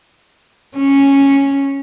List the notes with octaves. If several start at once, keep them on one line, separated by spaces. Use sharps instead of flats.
C#4